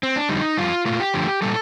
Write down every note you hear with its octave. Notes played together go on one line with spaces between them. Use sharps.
C4
D4
F2 D3 G3 D#4
F2 C3 G3 F4
A#2 A3 F4
G4
F2 D3 F3 A3
A#2 G3 A4